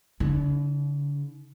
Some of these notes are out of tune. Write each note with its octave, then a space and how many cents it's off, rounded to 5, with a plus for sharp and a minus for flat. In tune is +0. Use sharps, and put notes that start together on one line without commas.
D3 -40 D#4 +20